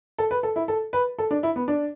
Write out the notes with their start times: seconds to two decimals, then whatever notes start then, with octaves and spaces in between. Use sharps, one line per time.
0.18 A4
0.31 B4
0.43 A4
0.56 E4
0.68 A4
0.93 B4
1.19 A4
1.31 D4
1.43 E4
1.56 B3
1.68 D4